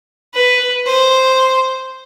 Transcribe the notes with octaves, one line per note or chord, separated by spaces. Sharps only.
B4
C5